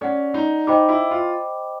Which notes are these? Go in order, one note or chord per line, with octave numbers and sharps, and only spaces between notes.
C#4 A4 D5 F#5
D#4
D#4 C5 D#5 G5 B5 D6
E4
F4